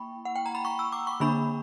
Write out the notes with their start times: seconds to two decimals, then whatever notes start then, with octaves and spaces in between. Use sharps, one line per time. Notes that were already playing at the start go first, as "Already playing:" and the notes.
Already playing: A#3 E4 G5 B5 C#6
0.25 F#5
0.36 G5
0.46 A#5
0.55 B5
0.65 C#6
0.79 E6
0.92 D6
1.07 C#6
1.20 D3 A#3 D4 B5